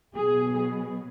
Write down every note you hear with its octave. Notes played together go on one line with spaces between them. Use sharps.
B2 F#3 B3 G#4